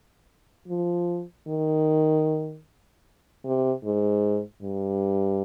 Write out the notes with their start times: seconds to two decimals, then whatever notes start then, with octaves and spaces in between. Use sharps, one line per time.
0.68 F3
1.47 D#3
3.45 C3
3.84 G#2
4.63 G2